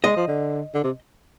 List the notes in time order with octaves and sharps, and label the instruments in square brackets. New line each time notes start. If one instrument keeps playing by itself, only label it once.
[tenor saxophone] G#3 [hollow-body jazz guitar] D#5
[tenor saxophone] F3
D3
D3
C3